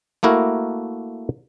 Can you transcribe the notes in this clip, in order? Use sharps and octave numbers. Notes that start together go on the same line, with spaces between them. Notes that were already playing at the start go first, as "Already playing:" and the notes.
A3 A#3 E4 F#4 A#4